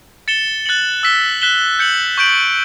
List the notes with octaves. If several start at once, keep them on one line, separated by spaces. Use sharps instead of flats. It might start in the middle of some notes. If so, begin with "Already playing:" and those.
A6 C#7 E7 G7
F#6 A6 C#7 F#7
E6 B6 E7 G7
F#6 B6 E7 G7
G6 C#7 F#7
C#6 G6 D7 F#7